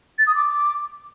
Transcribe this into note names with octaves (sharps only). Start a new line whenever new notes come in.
A6
D#6
D6